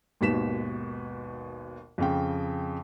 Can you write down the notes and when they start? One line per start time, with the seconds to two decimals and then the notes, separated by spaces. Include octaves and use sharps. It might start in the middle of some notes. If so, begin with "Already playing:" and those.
0.21 G#1 D#2 B2 B6 E7
1.98 F2 C#3 G5